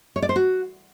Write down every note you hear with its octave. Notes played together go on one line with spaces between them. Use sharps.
C#5
D5
C5
F#4